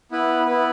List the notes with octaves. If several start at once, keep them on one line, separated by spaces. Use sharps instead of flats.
B3 E4 B4
B3 E4 B4